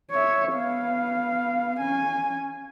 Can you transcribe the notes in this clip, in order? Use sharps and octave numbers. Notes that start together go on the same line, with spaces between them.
C#5 E5
B3 F5
C#4 G#5